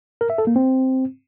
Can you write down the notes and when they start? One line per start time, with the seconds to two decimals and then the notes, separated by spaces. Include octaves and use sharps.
0.21 A#4
0.30 E5
0.38 A4
0.47 A#3
0.56 C4